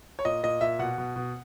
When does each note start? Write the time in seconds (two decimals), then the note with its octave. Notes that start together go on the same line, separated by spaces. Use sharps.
0.19 C#5
0.25 A#2 D#5
0.43 A#2 D#5
0.61 A#2 E5
0.79 B2 F#5
0.98 B2
1.16 B2